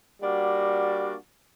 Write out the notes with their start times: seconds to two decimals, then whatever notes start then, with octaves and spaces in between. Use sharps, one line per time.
0.22 G3 A#3 D4 F#4